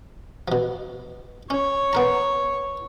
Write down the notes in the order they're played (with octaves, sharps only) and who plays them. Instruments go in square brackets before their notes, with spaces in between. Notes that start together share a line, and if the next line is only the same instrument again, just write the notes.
[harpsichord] B2 F3
[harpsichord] C#4 [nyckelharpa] C#5
[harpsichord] B3 A#4 A#5